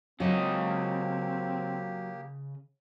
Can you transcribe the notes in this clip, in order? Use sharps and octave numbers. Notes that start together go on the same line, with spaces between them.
C#3 F#3 A#3 C4 G4 D#5